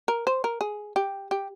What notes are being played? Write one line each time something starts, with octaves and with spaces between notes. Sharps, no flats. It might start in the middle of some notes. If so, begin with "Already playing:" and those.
A#4
C5
A#4
G#4
G4
G4